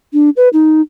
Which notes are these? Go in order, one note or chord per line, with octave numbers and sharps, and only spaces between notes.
D4
B4
D#4